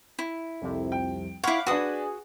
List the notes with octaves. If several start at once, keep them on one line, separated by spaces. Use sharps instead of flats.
E4
C2 F2 C3
G5
E4 C#5 F5 F#5 B5 D6
D4 F#4 G#4 B4 D#6